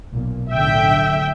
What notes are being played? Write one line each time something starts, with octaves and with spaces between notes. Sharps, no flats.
B1 A#2
B1 A2 D3 E5 G5